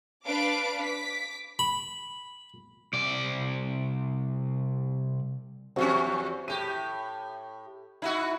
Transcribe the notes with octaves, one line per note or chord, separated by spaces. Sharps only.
D4 B4 F5 D6 D7
D6 B6
B5
C2 D5
E2 F3 C4 C#4 F#4 G4
A2 G4 D#7
D#4 E4 F#4